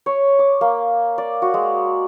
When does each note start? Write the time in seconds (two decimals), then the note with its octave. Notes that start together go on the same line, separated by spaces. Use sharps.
0.06 C#5
0.39 D6
0.61 A#3
1.18 D5
1.42 F#4
1.54 G#3